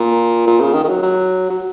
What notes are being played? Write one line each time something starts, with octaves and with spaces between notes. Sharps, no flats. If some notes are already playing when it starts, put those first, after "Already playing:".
Already playing: A#2
A#2
C#3
D#3
D#3
F#3
F#3
F#3